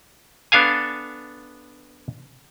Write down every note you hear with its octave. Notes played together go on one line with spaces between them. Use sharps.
B3 D4 A4 F5 G#5